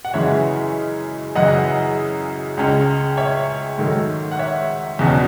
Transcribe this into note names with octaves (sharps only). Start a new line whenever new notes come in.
F#5
F#2 C#3 E3 G#3 C#4 C#5 E5
F#2 C#3 E3 D#5 F#5
C#2 C#3 G#3 C#4
C#5 E5
G#2 D#3 F#3 A3
F#5
C#5 E5
E2 B2 F#3 C#4